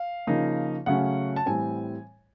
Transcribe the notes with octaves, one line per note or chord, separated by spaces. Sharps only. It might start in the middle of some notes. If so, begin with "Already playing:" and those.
Already playing: F5
C#3 F3 A#3 D#4
C#3 F#3 A3 C#4 F#5
A5
A2 E3 G3 C4 G#5